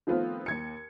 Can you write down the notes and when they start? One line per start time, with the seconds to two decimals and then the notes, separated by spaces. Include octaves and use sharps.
0.07 D#3 F3 A3 B3 C4 F4
0.46 D#2 G#6 C#7